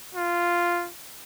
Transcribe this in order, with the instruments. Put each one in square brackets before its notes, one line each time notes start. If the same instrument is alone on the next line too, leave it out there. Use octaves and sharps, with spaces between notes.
[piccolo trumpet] F4